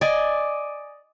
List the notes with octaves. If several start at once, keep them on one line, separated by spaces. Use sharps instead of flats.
D5 D#5 G#5